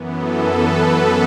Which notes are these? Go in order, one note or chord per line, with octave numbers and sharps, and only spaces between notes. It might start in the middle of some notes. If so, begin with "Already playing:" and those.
Already playing: F#2 E3 B3
A4
B4